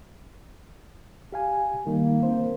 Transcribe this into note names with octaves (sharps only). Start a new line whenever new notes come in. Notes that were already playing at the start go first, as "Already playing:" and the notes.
G4 F5 G#5
D#3 G3 A#3 D#4
C4 C5